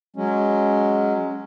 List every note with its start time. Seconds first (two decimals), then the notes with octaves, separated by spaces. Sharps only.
0.16 F#3 G#3 C#4